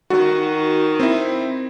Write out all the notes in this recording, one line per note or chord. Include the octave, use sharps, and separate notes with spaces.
D#3 F#4
C4 E4